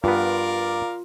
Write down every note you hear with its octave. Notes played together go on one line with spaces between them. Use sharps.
G2 B3 F4 A#4 D5 F5